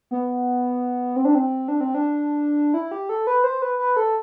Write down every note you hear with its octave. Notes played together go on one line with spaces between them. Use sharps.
B3
C4
D4
C4
D4
C4
D4
E4
G4
A4
B4
C5
B4
B4
A4